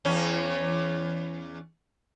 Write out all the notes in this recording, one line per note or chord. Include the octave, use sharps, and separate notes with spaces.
E2 C#4